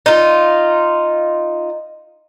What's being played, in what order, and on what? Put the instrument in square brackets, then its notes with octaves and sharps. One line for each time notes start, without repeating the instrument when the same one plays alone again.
[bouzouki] D#4 F4